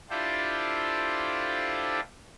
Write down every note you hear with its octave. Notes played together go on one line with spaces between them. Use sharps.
D4 E4 F4 G4 A4 C5